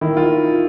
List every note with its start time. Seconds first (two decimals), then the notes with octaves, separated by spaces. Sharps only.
0.01 D#3 E4
0.17 F4